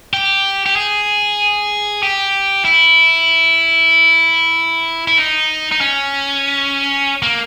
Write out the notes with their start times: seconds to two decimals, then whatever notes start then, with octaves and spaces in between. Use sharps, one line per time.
0.13 G4
0.66 G4
0.76 G#4
2.03 G4
2.65 E4
5.07 E4
5.18 D#4
5.71 D#4
5.81 C#4
7.23 A#3